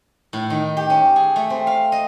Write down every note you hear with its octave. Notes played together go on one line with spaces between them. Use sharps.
A2
D#3
G4
C#4
G#4
A3
C4
F5
D#5